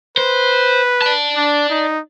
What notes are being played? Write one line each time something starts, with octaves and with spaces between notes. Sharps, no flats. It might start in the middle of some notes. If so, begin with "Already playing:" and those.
B4 C5
D5 A5
D4
D#4